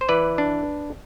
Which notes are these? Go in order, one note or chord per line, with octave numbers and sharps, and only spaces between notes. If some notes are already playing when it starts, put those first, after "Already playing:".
C5
E3 B4 D5
D4